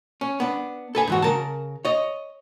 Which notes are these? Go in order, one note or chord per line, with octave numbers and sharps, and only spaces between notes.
C#4
B3 D4
A4 B4 G#5
G#2 E3 F#4
C#3 A#4 A5
C#5 D#5